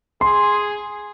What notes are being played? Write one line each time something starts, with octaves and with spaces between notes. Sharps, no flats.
G#4 C6